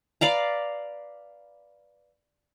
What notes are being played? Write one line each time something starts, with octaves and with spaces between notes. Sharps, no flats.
B4 D5 F5 A#5